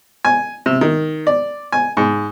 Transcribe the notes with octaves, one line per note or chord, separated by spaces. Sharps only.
G#5
C3
D#3
D5
G#5
G#2